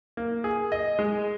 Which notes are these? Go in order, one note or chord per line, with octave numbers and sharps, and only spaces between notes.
A#3
G#4
D#5
G#3